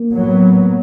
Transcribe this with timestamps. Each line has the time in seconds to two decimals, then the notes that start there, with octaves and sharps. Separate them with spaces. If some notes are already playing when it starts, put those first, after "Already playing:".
Already playing: A#3
0.12 A2 F#3 B3